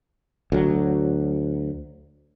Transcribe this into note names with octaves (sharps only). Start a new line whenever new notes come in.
D2 F#3